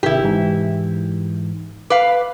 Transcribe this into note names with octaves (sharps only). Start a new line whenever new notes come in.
G#1 C3 E4 G4
G#2 E3
B4 F5 D6